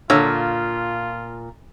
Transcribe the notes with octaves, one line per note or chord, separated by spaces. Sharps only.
A#2 D3 F4 C#5 E6